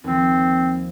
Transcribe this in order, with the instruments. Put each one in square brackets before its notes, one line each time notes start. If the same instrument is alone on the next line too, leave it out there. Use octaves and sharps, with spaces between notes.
[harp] D#2 F3 [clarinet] C4